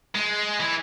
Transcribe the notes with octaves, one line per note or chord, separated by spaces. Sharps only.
G#3
E3